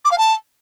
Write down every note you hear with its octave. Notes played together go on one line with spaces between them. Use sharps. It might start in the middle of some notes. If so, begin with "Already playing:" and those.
D6
F5
A5